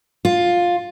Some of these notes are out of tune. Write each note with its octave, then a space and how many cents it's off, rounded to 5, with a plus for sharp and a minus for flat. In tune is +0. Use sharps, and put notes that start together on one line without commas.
F4 +10